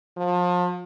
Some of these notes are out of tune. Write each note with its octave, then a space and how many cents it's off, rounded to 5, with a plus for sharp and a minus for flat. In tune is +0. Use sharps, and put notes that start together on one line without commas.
F3 +35